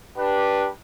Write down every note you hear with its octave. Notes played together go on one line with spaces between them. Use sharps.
D4 G4 B4